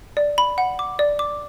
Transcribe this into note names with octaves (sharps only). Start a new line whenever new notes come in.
D5
B5
F#5
D6
D5
D6